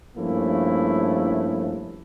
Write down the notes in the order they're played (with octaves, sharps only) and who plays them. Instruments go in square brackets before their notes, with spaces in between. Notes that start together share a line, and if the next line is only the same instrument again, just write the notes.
[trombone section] G2 F3 A3 A#3 C#4 E4